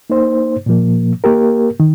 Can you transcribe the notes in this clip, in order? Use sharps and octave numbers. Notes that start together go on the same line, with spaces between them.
A#3 D#4 C5
A#2 F3 A#3
A#3 G4 A#4
D#3